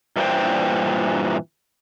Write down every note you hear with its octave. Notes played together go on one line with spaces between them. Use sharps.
G2 A#2 E3 D4 C5 G5